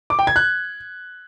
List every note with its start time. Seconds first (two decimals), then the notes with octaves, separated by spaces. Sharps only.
0.10 D6
0.19 G5
0.27 G#6
0.36 F#6